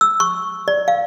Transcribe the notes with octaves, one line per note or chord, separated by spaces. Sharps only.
E6
C#6
D5
F5